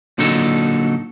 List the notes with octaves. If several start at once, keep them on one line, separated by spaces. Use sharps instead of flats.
A#2 D3 F#3 D#4 A4